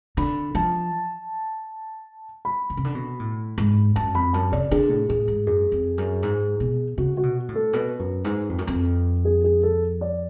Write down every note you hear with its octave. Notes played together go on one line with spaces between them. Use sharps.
D3 B5
F3 A5
B5
D3
C#3
D3
B2
A2
G#2
F#2 A5
F2 B5
F#2 A5
C#3 D5
D3 G#4
A2
A2 G#4
G#2
F#2 G#4
F2
F#2
G#2
B2
C#3 F#4
F#4
B2
A2
A4
B2 B4
F#2
G#2
F2
F#2
F2
G#4
G#4
A4
D5